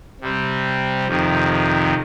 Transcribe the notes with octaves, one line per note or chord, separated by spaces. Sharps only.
C3 G3 C4
F2 C3 D#3